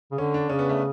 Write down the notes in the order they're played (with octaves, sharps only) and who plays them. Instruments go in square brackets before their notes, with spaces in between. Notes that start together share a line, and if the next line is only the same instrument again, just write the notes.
[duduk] C#3
[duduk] D3 [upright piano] C#4
[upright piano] D4
[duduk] C#3 [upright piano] C#4
[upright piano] B3
A3